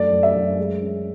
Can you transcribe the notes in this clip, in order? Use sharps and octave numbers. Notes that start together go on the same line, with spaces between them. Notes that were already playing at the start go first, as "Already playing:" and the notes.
Already playing: F#2 A3 D5
F#2
E5
F#2
G#3
C#4